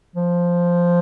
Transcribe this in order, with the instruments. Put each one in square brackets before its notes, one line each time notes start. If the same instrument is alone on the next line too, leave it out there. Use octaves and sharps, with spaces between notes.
[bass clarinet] F3